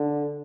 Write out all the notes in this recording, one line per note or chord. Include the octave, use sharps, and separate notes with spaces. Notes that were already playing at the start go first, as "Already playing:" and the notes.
Already playing: D3